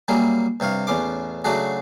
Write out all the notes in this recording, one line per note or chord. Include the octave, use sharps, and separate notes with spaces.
F#3 G3 A#3 E4 G#4
G2 C3 C#5 F5
A1 E2 C#4 C6 D6
C#3 F#3 A3 D4 F#4 G#4